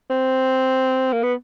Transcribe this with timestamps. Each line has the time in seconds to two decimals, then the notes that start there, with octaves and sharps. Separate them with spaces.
0.10 C4
1.13 A#3
1.23 B3